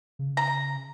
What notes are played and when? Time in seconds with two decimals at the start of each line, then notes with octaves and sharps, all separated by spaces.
0.19 C#3
0.37 A#5